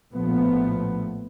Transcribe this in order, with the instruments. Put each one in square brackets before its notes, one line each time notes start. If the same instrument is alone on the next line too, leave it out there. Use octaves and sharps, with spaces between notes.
[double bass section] A#1 A2 F3 A3 B3